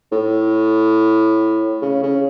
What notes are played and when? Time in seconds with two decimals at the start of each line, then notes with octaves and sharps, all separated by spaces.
0.12 A2
1.82 C#3
2.03 C#3